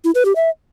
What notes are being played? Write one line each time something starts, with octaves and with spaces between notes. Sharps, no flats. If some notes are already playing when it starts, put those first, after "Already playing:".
E4
B4
G4
E5